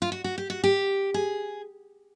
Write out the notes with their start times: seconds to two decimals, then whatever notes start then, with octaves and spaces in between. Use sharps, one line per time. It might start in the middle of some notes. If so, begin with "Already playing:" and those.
0.02 F4
0.12 F#4
0.24 F#4
0.38 G4
0.50 F#4
0.64 G4
1.14 G#4